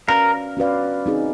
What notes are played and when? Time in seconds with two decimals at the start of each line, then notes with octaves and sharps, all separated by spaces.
0.08 C#4 F#4 A#4 B4 D5 F5
0.57 C#4 F#4 B4 D5 F5
1.06 C4 D#4 G#4